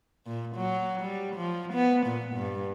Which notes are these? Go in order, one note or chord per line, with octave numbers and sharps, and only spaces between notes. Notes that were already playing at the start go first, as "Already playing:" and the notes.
A#2
F#3
G3
F3
B3
A#2
G2